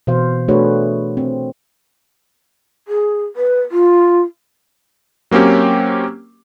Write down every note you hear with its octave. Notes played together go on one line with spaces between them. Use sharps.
B2 E3 C5 F5
A3 D4 F#4 G#4 B4 C#5
C4
G#4
B4
F4
F#3 A#3 C4 C#4 G4